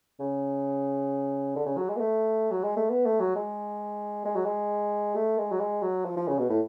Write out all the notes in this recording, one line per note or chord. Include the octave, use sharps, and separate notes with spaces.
C#3
D3
C#3
F#3
G#3
B3
A3
F#3
G#3
A3
B3
A3
F#3
G#3
G#3
F#3
G#3
A3
G#3
F#3
G#3
F#3
F3
F3
C#3
B2
A2